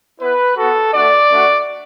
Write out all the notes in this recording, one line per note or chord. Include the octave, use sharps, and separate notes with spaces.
B3 E4 B4
F#4 A4
B3
A3 D4 F#4 D5
A3 D4 F#4